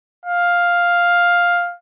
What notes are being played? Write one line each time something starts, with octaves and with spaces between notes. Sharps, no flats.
F5